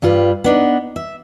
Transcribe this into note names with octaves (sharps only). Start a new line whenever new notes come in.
G2 G3 F4 B4
B3 D4 D#4
E5